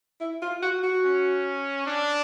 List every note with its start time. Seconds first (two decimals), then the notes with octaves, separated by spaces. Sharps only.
0.20 E4
0.42 F4
0.62 F#4
0.83 F#4
1.04 C#4
1.87 D4